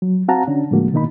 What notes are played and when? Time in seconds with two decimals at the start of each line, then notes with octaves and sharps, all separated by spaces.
0.02 F#3
0.28 C4 F#4 F5 F#5 A5 A#5
0.47 D3 C#4 D4
0.71 A2 D3 F3 G#3 A#3 F#4
0.93 B2 D#3 A#3 D#4 B5